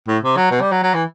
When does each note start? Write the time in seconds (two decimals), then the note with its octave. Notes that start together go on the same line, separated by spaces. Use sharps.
0.08 A2
0.23 C3
0.36 F#3
0.51 B2
0.61 G3
0.72 F#3
0.83 F#3
0.94 E3